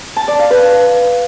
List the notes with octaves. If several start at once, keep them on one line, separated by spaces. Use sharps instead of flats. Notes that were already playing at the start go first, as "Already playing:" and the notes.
A5
D5
F5
B4